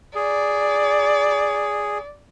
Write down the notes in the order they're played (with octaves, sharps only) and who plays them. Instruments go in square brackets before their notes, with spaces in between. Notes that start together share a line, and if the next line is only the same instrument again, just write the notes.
[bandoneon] G#4 [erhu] D5